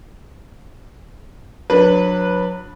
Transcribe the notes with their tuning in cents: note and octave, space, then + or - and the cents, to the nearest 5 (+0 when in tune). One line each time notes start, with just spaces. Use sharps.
F#3 -30 D4 +0 B4 -15